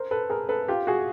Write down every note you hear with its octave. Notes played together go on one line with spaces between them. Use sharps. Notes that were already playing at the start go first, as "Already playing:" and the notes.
Already playing: A#4 C5
A4 B4
G#4 A#4
A4 B4
F4 G4
F#4 G#4